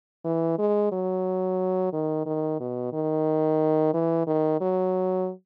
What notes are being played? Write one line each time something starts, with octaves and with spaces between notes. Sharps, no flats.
E3
G#3
F#3
D#3
D#3
B2
D#3
E3
D#3
F#3